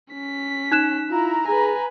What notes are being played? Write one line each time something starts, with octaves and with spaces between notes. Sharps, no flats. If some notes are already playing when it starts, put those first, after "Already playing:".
C#4 B6
D#4 F#6 E7
E4 F4 A#5
G#4 B4 G#5